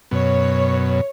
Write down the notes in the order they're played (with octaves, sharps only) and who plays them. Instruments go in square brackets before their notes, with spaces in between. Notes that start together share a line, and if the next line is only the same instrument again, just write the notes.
[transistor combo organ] F#2 B2 [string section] C#5